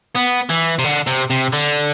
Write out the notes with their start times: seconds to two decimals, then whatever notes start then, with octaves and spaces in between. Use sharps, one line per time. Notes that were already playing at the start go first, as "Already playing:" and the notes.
0.15 B3
0.50 E3
0.79 C3
0.84 D3
1.07 C3
1.30 C3
1.53 D3